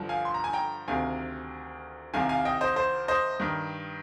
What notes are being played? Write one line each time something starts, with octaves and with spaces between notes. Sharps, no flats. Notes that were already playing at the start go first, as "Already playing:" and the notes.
Already playing: G2 D3 F3
F5 G#5
C6
A#5
G#5
G5 A#5
D2 C3 D#3 F5 G#5
C2 C3 D#3 F5 G#5
F5 G#5
D#5 G5
C5 D#5
C5
C5 D#5
G2 D#3